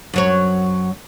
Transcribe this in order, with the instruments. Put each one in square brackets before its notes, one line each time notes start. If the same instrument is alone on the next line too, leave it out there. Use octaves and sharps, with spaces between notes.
[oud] F#2 F#3 C#5